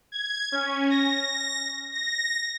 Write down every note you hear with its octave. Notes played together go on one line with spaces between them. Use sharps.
G#6
C#4
A#6
A#6